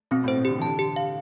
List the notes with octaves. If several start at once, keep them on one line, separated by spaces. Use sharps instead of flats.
B2 C4
A2
C5
B2
D3 G4
E3 A5
D3
G4
F5